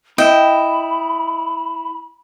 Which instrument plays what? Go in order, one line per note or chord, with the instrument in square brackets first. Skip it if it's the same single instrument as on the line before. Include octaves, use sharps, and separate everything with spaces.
[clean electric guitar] E4 [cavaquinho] D#5 G5 [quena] B5